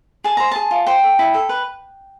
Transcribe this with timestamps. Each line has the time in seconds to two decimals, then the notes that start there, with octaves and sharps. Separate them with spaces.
0.24 G#4 A5
0.37 C5 A#5
0.51 G#4 A5
0.71 F4
0.86 C5 G5
1.03 A4
1.19 E4
1.34 A4
1.49 B4